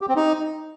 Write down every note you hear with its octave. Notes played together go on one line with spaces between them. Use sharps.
G4
C4
D#4